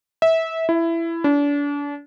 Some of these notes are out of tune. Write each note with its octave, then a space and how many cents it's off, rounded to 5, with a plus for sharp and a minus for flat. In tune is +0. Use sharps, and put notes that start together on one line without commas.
E5 -20
E4 +15
D4 -35